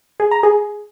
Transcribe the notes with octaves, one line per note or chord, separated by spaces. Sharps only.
G#4
A#5
G#4